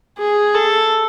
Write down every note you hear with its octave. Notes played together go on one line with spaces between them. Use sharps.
G#4
A4